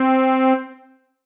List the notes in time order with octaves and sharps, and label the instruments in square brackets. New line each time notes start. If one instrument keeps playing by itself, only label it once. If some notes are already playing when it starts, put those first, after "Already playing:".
Already playing: [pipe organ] C4